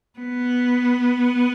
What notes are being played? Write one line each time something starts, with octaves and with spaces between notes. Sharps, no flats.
B3